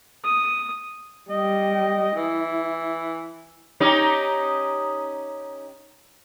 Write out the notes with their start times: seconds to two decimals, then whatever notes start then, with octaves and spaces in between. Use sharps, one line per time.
0.24 D#6
1.31 G3 D#5 G5
2.16 E3 E4
3.80 C#4 D#4 G4